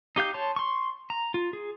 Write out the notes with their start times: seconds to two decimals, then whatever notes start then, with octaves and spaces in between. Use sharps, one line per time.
0.16 D#4 G4 F5 G6
0.34 C#5 A5 C6
0.56 C6 C#6
1.10 A#5
1.34 F4
1.53 G#4